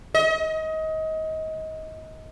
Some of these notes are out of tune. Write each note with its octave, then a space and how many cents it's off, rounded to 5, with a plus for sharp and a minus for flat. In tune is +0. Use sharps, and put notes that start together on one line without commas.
D#5 +25